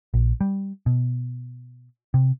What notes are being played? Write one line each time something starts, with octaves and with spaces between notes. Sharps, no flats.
A#1
G3
B2
C3